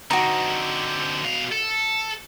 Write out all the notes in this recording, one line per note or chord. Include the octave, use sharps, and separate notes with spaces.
D3 C4 D#4 F#4
B2 F5
A4